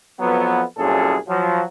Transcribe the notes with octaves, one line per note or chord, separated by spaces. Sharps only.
F2 F3 F#3 B3
C2 F#2 A#2 C#4 G#4 A4
F3 F#3